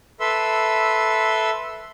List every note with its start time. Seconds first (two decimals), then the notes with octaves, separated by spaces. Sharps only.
0.20 A4 B4 E5 C6 E6